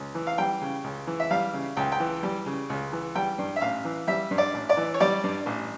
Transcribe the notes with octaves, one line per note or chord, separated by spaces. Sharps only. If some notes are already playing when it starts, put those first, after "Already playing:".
Already playing: C#2
E3
F5
G3 G5
C#3
C#2
E3
E5
G3 F5
C#3
C#2 G5
G5
E3
G3
C#3
C#2
E3
G3 G5
G2
E5
A1 F5
E3
G3 E5
G2
D5
A1
D5
E3
C#5
G3 D5
G2
A1